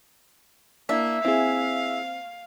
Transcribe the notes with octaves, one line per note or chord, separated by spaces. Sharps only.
A#3 D4 E4 E5
C4 E4 G#4 F5